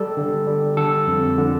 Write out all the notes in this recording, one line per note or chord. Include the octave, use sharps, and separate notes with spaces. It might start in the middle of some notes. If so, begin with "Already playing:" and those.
Already playing: G3 A4
D3
G3
D3 A4
F2
D3